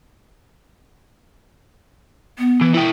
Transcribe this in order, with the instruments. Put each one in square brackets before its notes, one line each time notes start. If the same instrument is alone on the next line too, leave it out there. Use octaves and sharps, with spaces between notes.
[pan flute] B3
[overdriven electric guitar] E3
E4 G5